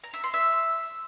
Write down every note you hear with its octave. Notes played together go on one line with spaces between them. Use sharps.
A#5
E5
C6
E5